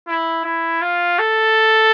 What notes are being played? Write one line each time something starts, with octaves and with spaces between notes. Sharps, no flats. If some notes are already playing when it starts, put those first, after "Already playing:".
E4
E4
F4
A4